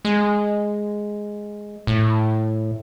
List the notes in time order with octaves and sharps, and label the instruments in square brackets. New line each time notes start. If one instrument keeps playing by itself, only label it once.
[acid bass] G#3
A2